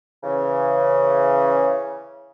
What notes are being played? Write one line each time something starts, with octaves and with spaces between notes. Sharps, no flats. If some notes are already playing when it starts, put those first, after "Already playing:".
C#3 E3